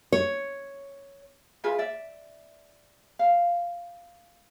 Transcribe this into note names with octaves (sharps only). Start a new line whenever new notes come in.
C#5
F4 G#4 B4 E5
D5 E5
F5